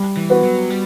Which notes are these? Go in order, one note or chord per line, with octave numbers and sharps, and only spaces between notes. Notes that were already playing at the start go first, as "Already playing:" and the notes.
Already playing: G3
E3
B3 F#4 B4
F#3
G3